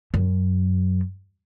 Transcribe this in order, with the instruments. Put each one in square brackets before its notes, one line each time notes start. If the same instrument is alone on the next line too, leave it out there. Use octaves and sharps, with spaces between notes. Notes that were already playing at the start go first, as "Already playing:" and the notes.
[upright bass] F#2